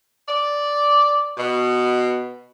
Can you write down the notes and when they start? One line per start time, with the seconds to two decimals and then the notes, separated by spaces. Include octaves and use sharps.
0.29 D5
1.37 B2